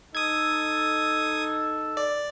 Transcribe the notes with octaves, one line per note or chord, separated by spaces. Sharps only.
D#4 A4 D#6 G#6
D5